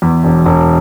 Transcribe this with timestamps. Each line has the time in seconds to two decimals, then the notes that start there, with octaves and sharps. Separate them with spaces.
0.02 E2
0.24 E1
0.45 E1